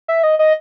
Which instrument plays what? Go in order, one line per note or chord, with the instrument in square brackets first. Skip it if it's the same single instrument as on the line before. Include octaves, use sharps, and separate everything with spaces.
[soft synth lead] E5
D#5
D#5